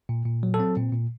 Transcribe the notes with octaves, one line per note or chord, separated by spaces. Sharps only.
A#2
A#2
F#3
A4
C4
A#2
A#2